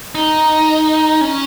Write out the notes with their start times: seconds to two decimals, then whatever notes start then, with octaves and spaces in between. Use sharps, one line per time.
0.15 D#4
1.21 C#4